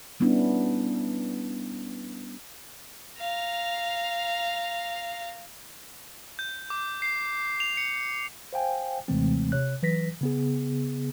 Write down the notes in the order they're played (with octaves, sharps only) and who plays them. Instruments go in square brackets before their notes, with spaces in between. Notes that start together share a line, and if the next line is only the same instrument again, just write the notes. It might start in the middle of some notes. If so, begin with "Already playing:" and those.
[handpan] G3 B3 C#4 D4 E4
[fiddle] F5 A#5
[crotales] G6
D6
C7
F7
C#7
[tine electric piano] C5 F5 G5 G#5
D#2 C3 E3 G#3 A3 C4
C3 C#5 F#6
E3 F#3 B4 A#6 B6
C#3 B3 G#4